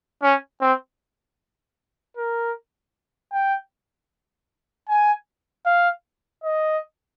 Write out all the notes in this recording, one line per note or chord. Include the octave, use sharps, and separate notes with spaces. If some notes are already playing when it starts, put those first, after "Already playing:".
C#4
C4
A#4
G5
G#5
F5
D#5